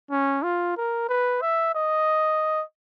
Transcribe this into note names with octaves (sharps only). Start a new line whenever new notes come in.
C#4
F4
A#4
B4
E5
D#5